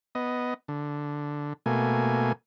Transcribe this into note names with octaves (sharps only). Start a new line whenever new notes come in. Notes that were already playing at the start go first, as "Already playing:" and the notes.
B3 D#5
D3
B2 A3 A#3 G#5